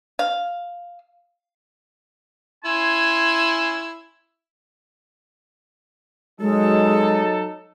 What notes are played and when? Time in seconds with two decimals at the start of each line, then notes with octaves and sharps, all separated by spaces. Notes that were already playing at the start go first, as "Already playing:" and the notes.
0.19 F5
2.65 C#4 E4 G#5 C6
6.40 F#3 G#3 D#4 A4